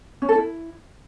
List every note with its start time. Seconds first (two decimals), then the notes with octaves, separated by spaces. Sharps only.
0.22 C#4
0.29 A4
0.35 E4